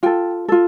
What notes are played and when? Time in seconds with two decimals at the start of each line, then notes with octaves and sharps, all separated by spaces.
0.03 F4 A4 G5
0.48 F4 A4